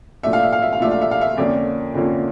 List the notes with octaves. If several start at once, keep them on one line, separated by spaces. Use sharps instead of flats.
A#2 F3 A3 D4 E5
F5
E5
F5
E5
F5
A#2 F3 A3 D4 E5
F5
E5
F5
E5
F2 D3 F3 A#3 C#4 D5
F2 D3 F3 A#3 C#4